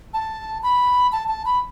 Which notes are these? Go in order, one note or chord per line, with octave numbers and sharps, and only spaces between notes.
A5
B5
A5
A5
B5